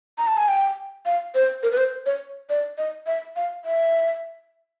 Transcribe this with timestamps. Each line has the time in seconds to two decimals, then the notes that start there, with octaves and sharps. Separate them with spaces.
0.18 A#5
0.27 A5
0.37 G#5
0.48 G5
1.06 F5
1.35 C5
1.63 A#4
1.72 B4
1.77 C5
2.06 C#5
2.49 D5
2.78 D#5
3.07 E5
3.36 F5
3.65 E5